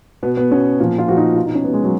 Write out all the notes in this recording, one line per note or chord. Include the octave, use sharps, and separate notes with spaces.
B2 B3
B3
B2 C#4
A#2 F3
F4
A#2 F3 F#4
D#4
B2 F4
D#4
C#4
B2 B3
G#3
F#3